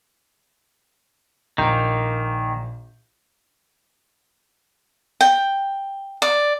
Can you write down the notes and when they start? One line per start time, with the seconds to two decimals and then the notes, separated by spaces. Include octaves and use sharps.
1.58 A#1 D#3 A#3 G6
5.21 G5
6.22 D5